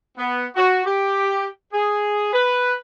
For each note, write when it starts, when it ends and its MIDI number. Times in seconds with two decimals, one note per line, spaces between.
0.18 0.46 59
0.55 0.81 66
0.85 1.45 67
1.72 2.31 68
2.33 2.73 71